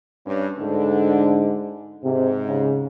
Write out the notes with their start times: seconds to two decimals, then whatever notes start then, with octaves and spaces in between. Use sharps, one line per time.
0.25 G2 C#4
0.59 D2 G#2 D3 D4
2.04 G#2 C3
2.48 C#3